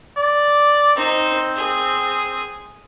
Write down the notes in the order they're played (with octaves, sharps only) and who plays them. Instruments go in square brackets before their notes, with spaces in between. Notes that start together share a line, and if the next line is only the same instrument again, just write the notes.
[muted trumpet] D5
[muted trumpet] C4 [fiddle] D#4 C5
[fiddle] G#4